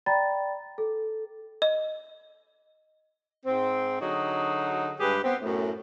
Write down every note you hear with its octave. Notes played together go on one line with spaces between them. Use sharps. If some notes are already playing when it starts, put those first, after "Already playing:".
D5 G5 A#5 B5 A6
A4
D#5
G#2 C4
D3 F#3 D#4 F#4 G#4
G2 G#3 G4 G#4 B4
B3 C4
F#2 A2